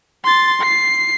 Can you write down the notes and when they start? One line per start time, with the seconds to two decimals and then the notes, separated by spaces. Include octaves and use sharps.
0.24 C6 A6
0.62 C7